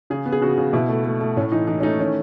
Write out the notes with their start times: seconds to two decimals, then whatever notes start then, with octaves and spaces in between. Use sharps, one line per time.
0.10 C#3 G#4
0.26 B3
0.33 G#4
0.41 C#3 F#4
0.58 C#3
0.73 B2 E4
0.89 A3
1.05 A3
1.21 A3
1.37 A2 C#4
1.52 E3 D#4
1.67 E3 D#4
1.80 C#4
1.83 A3 D#4
1.99 D#3 C#4